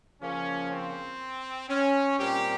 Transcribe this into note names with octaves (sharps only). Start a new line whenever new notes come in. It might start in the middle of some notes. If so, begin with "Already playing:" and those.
C#3 F3 A#3 C#4
C4
C#4
A#2 G3 C4 G4